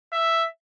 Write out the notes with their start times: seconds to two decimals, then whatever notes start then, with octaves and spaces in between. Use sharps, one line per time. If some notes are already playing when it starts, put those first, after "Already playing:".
0.13 E5